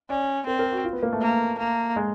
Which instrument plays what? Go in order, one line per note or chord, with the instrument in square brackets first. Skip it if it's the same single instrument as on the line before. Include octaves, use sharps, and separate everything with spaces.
[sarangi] C#4 [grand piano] D5
[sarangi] C4 [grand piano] A#4
[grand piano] A#4
F#4
F4
B3
A#3
A3
[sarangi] A#3
A#3
[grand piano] G#3